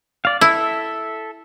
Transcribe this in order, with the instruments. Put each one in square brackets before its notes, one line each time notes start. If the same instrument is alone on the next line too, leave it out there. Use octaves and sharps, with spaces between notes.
[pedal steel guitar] D5 F5
[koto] E4 [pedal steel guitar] A4 E5